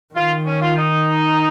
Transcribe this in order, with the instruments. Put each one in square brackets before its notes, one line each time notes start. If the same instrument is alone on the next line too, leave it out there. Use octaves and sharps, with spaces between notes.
[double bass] D#3 [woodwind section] F4
[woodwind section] C#4
F4
D#4